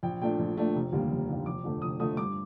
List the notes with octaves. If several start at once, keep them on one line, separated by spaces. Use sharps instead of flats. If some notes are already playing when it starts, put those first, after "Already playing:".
A#1 G5
A#2 A3 D4 G5
A#1
A#2 A3 D4
F1
D#2 D3 G3 A#3
F1
D#2 D3 G3 A#3
F1 D6
F2 D3 A3
F1 D#6
F2 D3 A3 D#6
G2 D6